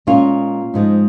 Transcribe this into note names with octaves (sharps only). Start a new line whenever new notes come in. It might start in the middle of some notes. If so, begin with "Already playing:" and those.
A#2 G#3 C#4 F4
G#2 F3 G#3